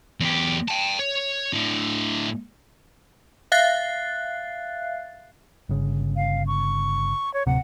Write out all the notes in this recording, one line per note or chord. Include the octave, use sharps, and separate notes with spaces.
E2 G4
G5 A5
C#5
A2 D3
E5 F5 F#6 A6 C7
G1 C#3
F5
C#6
C#5
D1 C3 F#5